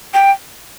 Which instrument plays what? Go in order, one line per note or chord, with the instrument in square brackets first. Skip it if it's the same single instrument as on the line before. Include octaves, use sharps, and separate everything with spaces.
[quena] G5